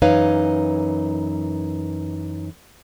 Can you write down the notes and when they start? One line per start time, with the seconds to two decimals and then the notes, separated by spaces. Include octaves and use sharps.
0.02 F#2 E3 D#4 B4 C#5 F5